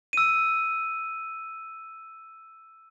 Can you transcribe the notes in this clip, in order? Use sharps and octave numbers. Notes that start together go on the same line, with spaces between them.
E6 D#7